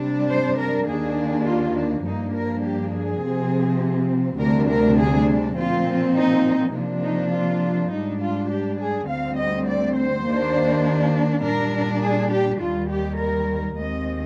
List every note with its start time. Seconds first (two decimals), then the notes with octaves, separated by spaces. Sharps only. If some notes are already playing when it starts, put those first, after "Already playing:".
Already playing: C3 G3 D4
0.29 C5
0.58 A#4
0.88 D#2 D#3 A#3 D4 G#4
1.46 F4
1.75 D4
2.05 G2 F3 A#3 D4 D#4
2.34 A#4
2.63 G4
2.93 G#4
3.22 C3 F3 C4
4.40 D2 C3 G3 D4 A#4
4.69 A#4
4.98 G#4
5.57 A#2 F3 C4 F4
6.15 D#4
6.74 C3 F3 A#3 D4
7.04 D#4
7.33 F4
7.91 G#2 G3 D4 D#4
8.21 F4
8.50 G4
8.80 G#4
9.08 D2 D3 G3 C4 F5
9.38 D#5
9.67 D5
9.97 C5
10.26 D#2 D#3 A#3 D4
11.43 A#2 G3 D4 A#4
12.02 G#4
12.31 G4
12.61 D#2 D#3 G3 F4
12.90 G4
13.19 A#4
13.78 D#2 D#3 G#3 C4 D#5